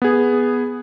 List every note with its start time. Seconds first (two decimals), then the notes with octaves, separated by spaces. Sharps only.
0.02 B3 G#4